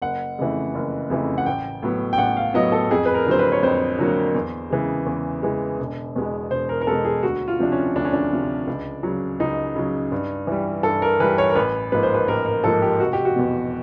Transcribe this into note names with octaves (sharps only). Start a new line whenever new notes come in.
F#1 F#5
F2 C#3 E3 A3
F#1
F2 C#3 E3 A3
F#5
A1 G5
A2 F#3 B3
G5
A1 F#5
F5
A2 F#3 B3 D#5
A4
F2 G#4
B4
A#4
D3 F#3 A#3 C5
B4
C#5
F2 C5
D3 F#3 A#3
E2
C#3 E3 G#3
E2
C#3 E3 G#3
E1
E2 B2 G#3 B3
E1 C5
A#4
A#4
E2 B2 G#3 B3 A4
G#4
D2 F#4
F4
C3 F3 D4
C#4
D2 D4
C#4
D4
C3 F3
C#2
C#3 F#3
C#2 D#4
C#3 F#3
G2
E3 G3
G2 A4
A#4
E3 G3 B4
C#5
A#4
A1 B4
G#2 F3 A#3 B4
C5
B4
A1 A#4
A#4
G#2 F3 A#3 A4
G4
F1 F#4
G4
F#4
E2 B2